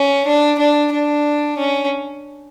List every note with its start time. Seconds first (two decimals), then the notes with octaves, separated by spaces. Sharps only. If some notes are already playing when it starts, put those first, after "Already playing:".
Already playing: C#4
0.26 D4
0.59 D4
0.92 D4
1.58 C#4